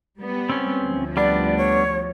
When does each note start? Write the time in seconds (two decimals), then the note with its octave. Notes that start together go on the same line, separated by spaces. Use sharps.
0.18 G3 B3
0.50 C4 C#4
0.85 D2 F3
1.17 G3 B3 D4 D5
1.57 C#5